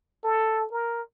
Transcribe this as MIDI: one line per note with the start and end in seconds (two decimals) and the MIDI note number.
0.24 0.66 69
0.71 1.02 70